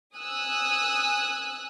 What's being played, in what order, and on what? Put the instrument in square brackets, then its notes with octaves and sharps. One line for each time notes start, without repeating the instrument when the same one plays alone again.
[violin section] G#5 D#6 E6 F#6